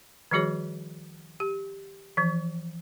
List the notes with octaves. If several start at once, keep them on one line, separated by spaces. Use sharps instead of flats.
D#3 F3 G3 F#4 G#4 C#5
G4
E3 F3